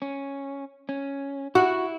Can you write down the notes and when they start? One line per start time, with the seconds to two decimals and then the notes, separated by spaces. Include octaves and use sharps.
0.02 C#4
0.89 C#4
1.55 E4 F#4